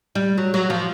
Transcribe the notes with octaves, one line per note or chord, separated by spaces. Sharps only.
G3
F#3
F#3
F3